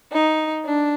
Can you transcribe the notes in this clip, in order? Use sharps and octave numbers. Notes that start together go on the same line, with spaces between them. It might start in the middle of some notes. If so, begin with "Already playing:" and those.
D#4
D4